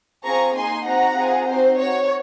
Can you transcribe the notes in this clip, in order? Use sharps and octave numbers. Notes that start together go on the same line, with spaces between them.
C4 F4 G#4 A#5 C#6
A#3 D#4 G#4 G#5 C6
C4 D#4 F#4 F#5 A#5
C4 F4 G#4
C4 D#4 F#4 C5
C4 F#4 C#5